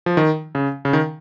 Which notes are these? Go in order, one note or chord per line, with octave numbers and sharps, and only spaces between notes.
F3
D#3
C#3
C#3
D#3